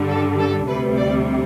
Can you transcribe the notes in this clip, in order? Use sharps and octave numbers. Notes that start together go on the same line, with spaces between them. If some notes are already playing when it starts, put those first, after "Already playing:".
Already playing: G2 D3 G3
A4
A4
D2 C3 G3 B4
D5